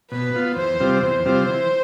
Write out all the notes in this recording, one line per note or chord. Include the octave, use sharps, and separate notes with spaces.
B2 B4
B3 F4
E2 C5
C3 G3 C4 F4
E2 C5
C3 G3 C4 F4
E3